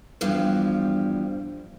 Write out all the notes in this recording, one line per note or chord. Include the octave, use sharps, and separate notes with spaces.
E2 G2 F3 G3